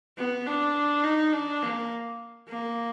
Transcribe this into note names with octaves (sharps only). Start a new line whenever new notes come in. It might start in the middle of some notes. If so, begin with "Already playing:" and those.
B3
D4
D#4
D4
A#3
A#3